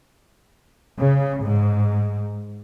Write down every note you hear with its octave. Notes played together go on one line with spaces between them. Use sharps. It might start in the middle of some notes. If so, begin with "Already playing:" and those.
C#3
G#2